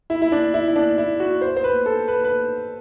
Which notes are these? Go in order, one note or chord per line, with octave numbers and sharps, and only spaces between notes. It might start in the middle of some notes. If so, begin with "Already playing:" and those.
E4
E4
D4
E4
E4
D4
E4
F#4
C5
C5
B4
A4
B4
B4